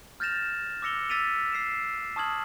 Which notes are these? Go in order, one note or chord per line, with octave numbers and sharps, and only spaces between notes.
F6 G6 A6 A#6 E7 F7
D6 E6 A#6 C#7 F7 G7
E6 A6 B6 D7 D#7 F7
E6 C7 D7 E7
A5 C#6 D#6 F6 G#6 F#7